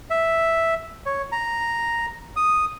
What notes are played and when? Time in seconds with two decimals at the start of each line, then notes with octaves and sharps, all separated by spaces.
0.10 E5
1.06 C#5
1.32 A#5
2.36 D#6